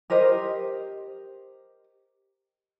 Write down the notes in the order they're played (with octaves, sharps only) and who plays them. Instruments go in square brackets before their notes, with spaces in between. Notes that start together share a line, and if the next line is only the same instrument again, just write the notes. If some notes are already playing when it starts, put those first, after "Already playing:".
[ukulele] G4 A#4 C5 D#5